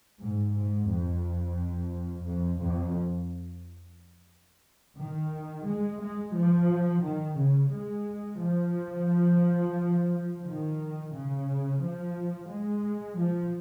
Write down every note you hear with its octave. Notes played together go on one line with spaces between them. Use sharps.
G#2
G#2
F2
F2
F2
D#3
G#3
G#3
F3
D#3
C#3
G#3
F3
D#3
C#3
F3
G#3
F3